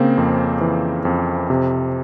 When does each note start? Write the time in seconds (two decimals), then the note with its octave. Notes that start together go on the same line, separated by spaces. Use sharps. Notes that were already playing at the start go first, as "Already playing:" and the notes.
Already playing: C#3 A#3 C4
0.18 F2
0.61 E3
1.05 F2
1.50 C3